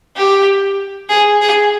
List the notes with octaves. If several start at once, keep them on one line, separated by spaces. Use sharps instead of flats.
G4
G#4
G#4